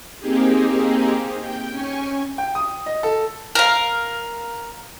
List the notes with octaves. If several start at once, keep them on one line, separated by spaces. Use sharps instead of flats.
A#3 C4 D#4 G4 G#4
G5
C#4 G#5 C#6
G5
D#6
D#5
A4
A#4 F5